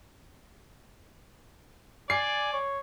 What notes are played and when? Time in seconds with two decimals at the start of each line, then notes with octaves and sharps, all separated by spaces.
2.10 D5 G#5 C7
2.53 C#5